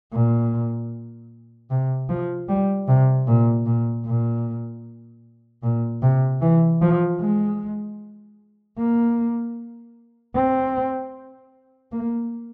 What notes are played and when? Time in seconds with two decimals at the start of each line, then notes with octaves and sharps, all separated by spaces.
0.12 A#2
1.70 C3
2.09 F3
2.48 G3
2.88 C3
3.27 A#2
3.66 A#2
4.05 A#2
5.63 A#2
6.02 C3
6.41 E3
6.81 F3
7.20 G#3
8.78 A#3
10.35 C4
11.92 A#3